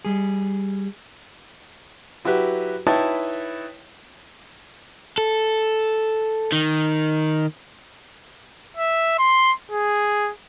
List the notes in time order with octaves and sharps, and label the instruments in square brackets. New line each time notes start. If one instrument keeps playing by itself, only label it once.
[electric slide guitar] G3 G#4
[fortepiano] F#3 E4 F#4 G4 B4
D#4 E4 B4 C#5 G5 A5
[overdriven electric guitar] A4
D#3
[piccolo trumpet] E5
C6
G#4